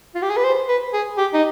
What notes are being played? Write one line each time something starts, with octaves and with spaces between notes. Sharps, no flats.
F4
G4
G#4
B4
C5
B4
G#4
G4
D#4